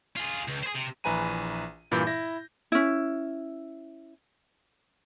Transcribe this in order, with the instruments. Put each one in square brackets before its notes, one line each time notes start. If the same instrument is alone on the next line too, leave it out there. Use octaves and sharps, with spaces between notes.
[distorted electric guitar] F4 G#4
C#2
G#4 C5
C3
[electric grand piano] A#1 E3 B4 G#5 A#5 D#7
G2 A#2 E3 B5 G6
E4 A#6
[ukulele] C#4 E4